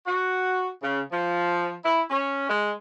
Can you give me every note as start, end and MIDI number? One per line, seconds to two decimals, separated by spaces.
0.06 0.69 66
0.82 1.00 49
1.12 1.73 53
1.85 2.01 64
2.09 2.48 61
2.48 2.71 56